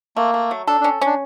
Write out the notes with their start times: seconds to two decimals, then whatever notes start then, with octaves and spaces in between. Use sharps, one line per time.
0.16 A3 A#3
0.34 A3
0.51 F#3
0.67 D4 A4
0.81 C#4 D4
1.01 C#4 D4